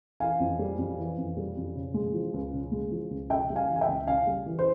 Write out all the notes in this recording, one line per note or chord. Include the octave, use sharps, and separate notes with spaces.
E3 F5 G#5
F2
G3
F2
E3
F2
G3
F2
C#3
G#3
F3
C#2
C#3
G#3
F3
C#2
C#3 E5 G5
G3
F5 G#5
E3
G#5
E5 G5
C#2
C#3 F5 G#5
G3
E3
C5